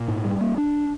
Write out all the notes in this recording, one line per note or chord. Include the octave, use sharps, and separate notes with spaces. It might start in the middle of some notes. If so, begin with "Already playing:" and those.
Already playing: A#2
G#2
G3
A#3
D4